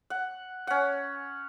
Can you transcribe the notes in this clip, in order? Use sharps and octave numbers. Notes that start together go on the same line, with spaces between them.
F#5
C#4 F#5